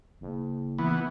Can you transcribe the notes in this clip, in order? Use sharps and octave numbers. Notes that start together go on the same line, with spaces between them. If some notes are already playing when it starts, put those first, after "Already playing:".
F#1
E3 B3